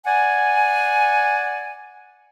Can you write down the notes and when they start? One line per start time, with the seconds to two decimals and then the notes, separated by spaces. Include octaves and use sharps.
0.06 D5 F#5 G#5